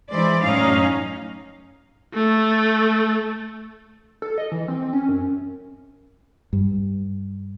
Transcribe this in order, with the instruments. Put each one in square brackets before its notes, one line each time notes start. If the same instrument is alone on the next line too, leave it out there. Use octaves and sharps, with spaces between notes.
[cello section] E3 G#3 E4 C5 D5
F#2 A2 C#4 D#4 F5
[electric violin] A3
[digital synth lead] A4
D#5
E3
C4
C#4
F#2
[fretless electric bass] G2